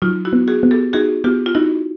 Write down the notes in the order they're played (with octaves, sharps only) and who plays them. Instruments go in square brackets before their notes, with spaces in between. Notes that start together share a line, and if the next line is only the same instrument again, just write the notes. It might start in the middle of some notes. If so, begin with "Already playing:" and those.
[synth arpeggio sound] F#3 [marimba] D#4 F4
[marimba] E4 F#4
[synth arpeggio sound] B3
[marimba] F#4 G#4
[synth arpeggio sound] B3
[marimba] G4 A4
[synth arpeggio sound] D#4 [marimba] F#4 G#4
[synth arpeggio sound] B3 [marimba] F4 G4
[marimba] F4
[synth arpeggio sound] D#4 [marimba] E4 F#4